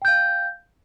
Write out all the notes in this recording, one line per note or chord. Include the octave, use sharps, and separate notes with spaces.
F5 G5 G6